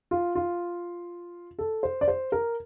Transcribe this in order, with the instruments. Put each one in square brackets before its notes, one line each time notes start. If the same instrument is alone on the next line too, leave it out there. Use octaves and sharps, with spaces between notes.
[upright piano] F4
F4
A4
C5
D5
C5
A#4